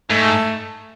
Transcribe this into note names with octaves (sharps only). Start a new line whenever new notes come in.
G#2 A3